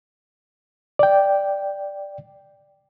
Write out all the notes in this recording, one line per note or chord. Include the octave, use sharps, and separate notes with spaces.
D5 G5